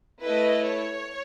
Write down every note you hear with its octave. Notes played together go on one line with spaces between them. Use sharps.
A3 E4 A4 B4 D#5
C#5